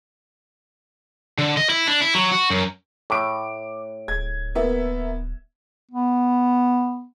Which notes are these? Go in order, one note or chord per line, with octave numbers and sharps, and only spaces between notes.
D3
D#5
E4
D4
E4
F#3
F#4
F#2
A2 D6 D7
D1 G#6
A#3 B3 E5
B3